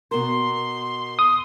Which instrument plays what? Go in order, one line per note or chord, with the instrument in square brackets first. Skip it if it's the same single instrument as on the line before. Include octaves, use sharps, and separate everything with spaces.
[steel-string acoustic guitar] B2 A#4 [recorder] C6
[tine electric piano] D#6